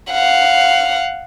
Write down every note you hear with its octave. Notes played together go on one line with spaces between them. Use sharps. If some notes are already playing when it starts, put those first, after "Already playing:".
F5 F#5